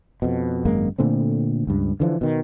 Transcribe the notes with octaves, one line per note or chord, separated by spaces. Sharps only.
F2 B2
G#1 F#2 G#3 A#3
A#2 D3 A3 C4
C#2 G2
D3 E3 F3
B2 D#3